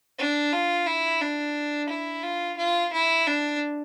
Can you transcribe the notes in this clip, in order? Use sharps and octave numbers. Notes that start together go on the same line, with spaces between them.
D4
F4
E4
D4
E4
F4
F4
E4
D4